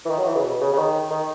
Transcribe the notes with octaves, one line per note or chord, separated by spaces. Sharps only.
E3
D#3
F#3
E3
C#3
B2
C#3
C#3
D#3
D#3